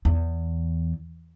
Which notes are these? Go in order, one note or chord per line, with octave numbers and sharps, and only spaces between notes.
E2